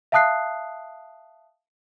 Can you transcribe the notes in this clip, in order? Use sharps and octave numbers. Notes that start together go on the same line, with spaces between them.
E5 F5 A5 D#6 F#6 C7